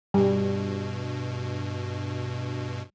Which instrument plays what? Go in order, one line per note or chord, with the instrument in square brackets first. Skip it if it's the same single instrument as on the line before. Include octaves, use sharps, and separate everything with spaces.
[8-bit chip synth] G2 B2 [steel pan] G3